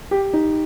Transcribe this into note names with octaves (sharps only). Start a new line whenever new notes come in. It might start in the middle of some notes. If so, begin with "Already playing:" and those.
G4
D#4